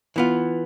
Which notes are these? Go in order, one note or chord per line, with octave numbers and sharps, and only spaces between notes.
E3 B3 F4